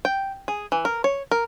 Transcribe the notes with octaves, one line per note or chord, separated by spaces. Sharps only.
G5
G#4
E3
A#4
C#5
A#4